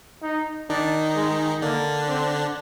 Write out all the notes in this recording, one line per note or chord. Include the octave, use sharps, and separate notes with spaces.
D#4
D#3 D4 D#4
G#3
D3 A#3 D4
C4